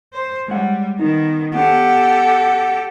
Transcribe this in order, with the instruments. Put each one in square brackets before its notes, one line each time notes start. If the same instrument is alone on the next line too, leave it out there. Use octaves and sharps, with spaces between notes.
[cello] C5
[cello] G3 [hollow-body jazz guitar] G#3 C#5 F#5
[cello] D#3 B3 [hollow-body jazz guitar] D#4
[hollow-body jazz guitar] B3 D4 C#5 [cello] G4 A4 [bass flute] F#5